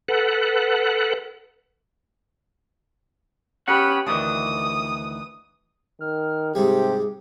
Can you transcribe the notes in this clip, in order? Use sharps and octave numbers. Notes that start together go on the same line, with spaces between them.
A4 B4 F#5
B3 C#4 G4 F#5 B5
D2 D#3 E3 D#6
D#3 F6
G#2 C3 G3 G4 G#4